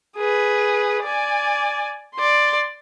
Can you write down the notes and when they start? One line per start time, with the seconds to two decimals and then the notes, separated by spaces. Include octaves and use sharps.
0.17 G#4 B4
1.03 D5 G#5
2.15 D5 C6